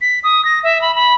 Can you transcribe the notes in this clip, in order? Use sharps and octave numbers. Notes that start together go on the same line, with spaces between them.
B6
D#6
A#6
E5
B5
B5